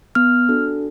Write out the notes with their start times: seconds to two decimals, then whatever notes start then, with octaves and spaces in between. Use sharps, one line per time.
0.15 B3 F6
0.49 D4 F#4 A4